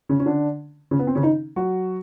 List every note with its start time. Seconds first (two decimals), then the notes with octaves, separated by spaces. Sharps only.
0.09 C#3 C#4
0.20 C#4
0.26 D3 D4
0.91 C#3 C#4
0.99 B3
1.07 C4
1.15 C#3 C#4
1.23 D#3 D#4
1.56 F#3 F#4